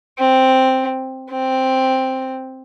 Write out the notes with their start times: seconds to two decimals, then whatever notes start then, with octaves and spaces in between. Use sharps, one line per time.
0.18 C4
1.30 C4